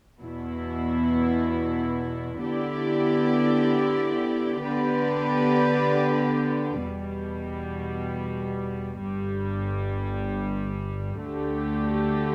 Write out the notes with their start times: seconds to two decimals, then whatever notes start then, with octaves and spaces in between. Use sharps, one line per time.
0.19 E2 B2 B3 E4
2.40 D3 B3 E4 G4 D5
4.61 D3 B3 G4 B4 D5
6.81 E2 B2 G3
9.02 G1 G2 G3
11.22 D2 D3 A3 G4